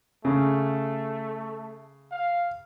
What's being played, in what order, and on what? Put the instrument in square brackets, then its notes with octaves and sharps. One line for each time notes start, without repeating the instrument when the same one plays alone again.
[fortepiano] C#3 [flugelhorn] A3
[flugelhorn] F5